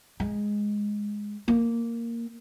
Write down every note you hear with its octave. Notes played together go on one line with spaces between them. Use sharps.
G#3
A#3